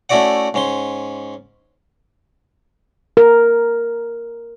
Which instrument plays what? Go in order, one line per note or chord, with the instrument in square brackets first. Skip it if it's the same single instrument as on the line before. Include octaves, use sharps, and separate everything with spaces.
[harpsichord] A3 C#4 E4 F#4 D5 F#5
G#2 C#4 C6
[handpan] A#4